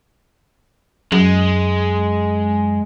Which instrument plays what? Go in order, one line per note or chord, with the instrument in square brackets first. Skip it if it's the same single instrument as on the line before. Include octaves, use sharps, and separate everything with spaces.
[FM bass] F#2 [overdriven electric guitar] G#3